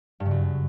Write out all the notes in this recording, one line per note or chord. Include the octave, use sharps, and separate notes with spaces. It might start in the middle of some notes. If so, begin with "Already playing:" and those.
G2
C#3
F#2